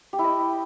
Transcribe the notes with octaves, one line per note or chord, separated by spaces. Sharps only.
G4
E4
D#5